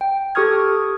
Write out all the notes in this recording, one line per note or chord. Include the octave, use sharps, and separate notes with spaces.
G5
G4 A4 C#6 D#6 F6 G#6